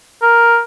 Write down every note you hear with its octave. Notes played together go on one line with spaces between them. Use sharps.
A#4